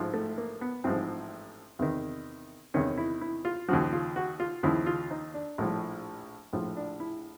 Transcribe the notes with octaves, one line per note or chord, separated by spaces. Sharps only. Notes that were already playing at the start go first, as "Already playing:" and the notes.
Already playing: A1 G#2 F3
A3
A#3
B3
A1 G#2 F3 C4
E2 C3 D#3
E2 C3 D#3 C#4
E4
E4
F4
D#2 C#3 F3 F#4
F4
F#4
F4
D#2 C#3 F3 E4
F4
D#4
D4
A#1 A2 F3
A#1 A2 F3
D4
E4